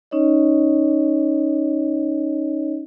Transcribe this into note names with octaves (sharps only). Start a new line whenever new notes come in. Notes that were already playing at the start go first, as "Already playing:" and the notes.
C#4 D#4 C#5 D#5